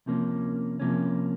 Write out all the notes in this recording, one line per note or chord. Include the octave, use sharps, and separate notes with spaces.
C3 F3 A#3 C#4
C3 F3 A#3 C#4